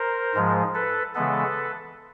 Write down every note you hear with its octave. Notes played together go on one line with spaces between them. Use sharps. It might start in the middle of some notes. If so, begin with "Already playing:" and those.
Already playing: A#4 C5
G#2 F3 G#3
A4 B4
C#3 E3 G#3 B3 A4 B4